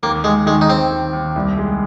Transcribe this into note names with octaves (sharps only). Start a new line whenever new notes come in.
D#2 A#3
D#2 G#3
D#3 G#3
D#4
D#2 C4
D#3
D#2
C2
G#3